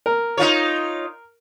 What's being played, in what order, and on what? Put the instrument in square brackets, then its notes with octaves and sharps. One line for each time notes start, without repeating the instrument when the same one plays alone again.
[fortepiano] A#4
[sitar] D#4 F4 C#5